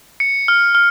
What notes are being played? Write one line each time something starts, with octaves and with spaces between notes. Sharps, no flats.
C#7
F6
F6